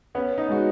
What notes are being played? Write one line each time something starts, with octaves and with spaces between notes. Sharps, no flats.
B3 C#4
D#4
G#3 F#4